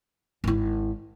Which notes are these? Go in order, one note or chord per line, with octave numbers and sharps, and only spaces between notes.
G#1 E4